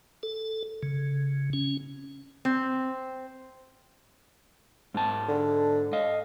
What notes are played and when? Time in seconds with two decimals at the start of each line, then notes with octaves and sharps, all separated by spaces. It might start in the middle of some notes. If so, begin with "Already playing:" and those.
0.23 A4
0.83 C#3
1.53 C#4
2.45 C4
4.94 G#2 A5
5.28 D3
5.93 D#5 F5